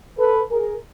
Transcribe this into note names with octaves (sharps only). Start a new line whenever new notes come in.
A4 B4
G#4 A#4